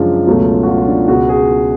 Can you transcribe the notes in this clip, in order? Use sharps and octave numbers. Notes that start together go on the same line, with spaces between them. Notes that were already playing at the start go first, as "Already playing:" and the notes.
Already playing: F#2 C#3 F3 G#3 D4 F4
C#2 B2 F#3 A3
F#4
F4
F4
D4
C#2 B2 G#3 F#4
G#4